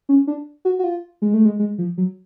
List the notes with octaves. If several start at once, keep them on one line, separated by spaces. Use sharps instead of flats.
C#4
D4
F#4
F#4
F4
G#3
A3
G#3
G#3
F3
F#3